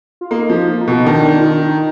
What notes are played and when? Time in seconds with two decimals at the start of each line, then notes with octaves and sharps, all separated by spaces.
0.21 F4
0.30 A#3 D#4
0.50 F3
0.56 F4
0.81 D#4
0.87 B2
1.06 D#3 D4
1.39 F4
1.44 D#4